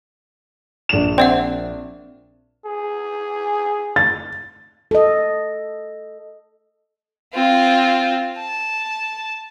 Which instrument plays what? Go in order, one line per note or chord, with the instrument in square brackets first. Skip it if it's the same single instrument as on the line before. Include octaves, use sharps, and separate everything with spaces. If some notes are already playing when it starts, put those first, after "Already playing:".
[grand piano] A#1 E7
[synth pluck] C4 [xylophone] D5 E5 F#5
[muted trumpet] G#4
[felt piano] A6
[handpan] A4 D#5
[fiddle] C4 F4
A5